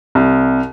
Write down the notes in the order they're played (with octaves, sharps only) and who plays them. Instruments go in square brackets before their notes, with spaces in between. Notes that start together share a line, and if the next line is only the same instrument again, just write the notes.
[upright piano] C2